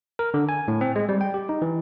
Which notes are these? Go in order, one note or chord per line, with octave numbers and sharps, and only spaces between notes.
A#4
D3
G#5
A2
C4
G#3
G3
G5
G4
D#4
E3